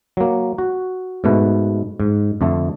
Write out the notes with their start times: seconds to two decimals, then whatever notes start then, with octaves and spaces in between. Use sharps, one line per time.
0.17 F#3 A#3
0.58 F#4
1.24 G#2 B2 A3 B4
2.00 G#2
2.41 F2 D3 A3